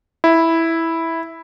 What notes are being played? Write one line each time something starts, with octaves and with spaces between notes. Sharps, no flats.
E4